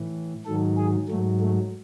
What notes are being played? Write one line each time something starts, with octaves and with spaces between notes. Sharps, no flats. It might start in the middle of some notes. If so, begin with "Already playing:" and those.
Already playing: A2 E3
G#2 D#3 F#3 A4
G#4
G#2 F#3 A3
A3